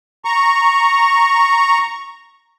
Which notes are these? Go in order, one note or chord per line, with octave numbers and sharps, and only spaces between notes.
A#5 C#6